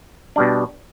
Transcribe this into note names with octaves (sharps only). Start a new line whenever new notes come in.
B2 G3 D4